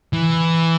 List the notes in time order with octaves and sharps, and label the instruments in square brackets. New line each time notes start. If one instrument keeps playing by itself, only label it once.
[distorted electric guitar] E3